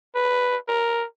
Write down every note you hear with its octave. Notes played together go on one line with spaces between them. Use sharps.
B4
A#4